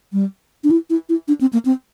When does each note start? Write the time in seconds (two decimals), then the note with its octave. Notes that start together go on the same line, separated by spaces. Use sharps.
0.13 G3
0.64 D4
0.71 E4
0.90 E4
1.09 E4
1.28 D4
1.41 C4
1.53 A#3
1.65 C4